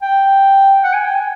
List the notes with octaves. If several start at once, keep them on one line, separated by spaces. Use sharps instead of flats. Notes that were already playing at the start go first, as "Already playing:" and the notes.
G5
F#5
G#5
G5
G#5